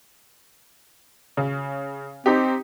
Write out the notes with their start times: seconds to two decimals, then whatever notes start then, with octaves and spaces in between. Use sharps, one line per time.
1.37 C#3
2.26 C4 D#4 G4